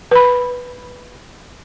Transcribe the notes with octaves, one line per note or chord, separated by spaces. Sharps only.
B4 B5